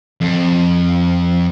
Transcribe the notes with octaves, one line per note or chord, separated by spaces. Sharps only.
F2